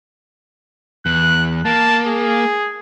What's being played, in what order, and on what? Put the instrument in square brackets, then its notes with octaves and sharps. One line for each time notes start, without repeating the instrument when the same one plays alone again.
[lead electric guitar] E2 [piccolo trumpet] F#6
[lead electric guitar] A#3 [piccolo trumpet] A5
[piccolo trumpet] G#4